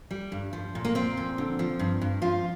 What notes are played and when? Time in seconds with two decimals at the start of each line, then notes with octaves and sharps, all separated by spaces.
0.11 G3
0.32 G2
0.53 F3
0.75 A#2
0.85 A#3
0.95 F3 C4
1.17 A#2
1.38 D3
1.59 F3
1.79 G2
2.02 G2
2.22 F3 F4